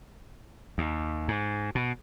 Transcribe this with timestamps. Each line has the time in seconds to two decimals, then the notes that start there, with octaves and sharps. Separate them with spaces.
0.78 D#2
1.28 G#2
1.75 B2